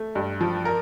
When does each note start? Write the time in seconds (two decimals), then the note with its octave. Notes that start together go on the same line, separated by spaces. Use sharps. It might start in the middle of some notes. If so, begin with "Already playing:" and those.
Already playing: A3
0.15 G2
0.41 F3
0.65 A#4